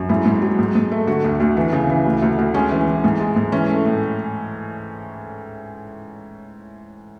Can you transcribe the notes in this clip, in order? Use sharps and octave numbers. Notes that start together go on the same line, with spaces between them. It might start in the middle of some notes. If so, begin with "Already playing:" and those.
Already playing: F#2
G#2 E4
G#2
F#3
G#2
G#2
A3
D3 F#4
D2
D2
E3
C#3
E3
D2
D2
D2
G#3 C#4
E3
E3
G#2
G#3
G#2
E3 C#4
A3
A2